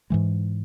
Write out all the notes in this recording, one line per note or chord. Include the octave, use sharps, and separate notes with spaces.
G#2 E3 G#3